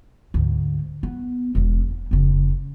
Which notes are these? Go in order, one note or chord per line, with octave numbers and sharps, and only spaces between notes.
D2 G#2
B3
E1 E3
E2
F1 C#3